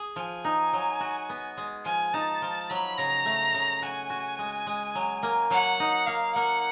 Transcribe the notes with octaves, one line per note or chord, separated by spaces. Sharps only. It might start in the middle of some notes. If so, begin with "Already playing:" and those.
Already playing: G#4
F3 G#5
D#4
F#3
F#4
B3
G#3
F3 G#5
D#4 A5
F3
F#3 B5
C#3 A#5
A3
C#3
F#4 G#5
F#4
G#3
G#3
F#3
A#3
F#3 F#5
D#4
A#3 F5
A#3 F#5